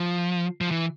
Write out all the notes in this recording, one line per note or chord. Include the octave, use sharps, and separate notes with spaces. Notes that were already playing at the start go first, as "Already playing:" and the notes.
Already playing: F3
F3
E3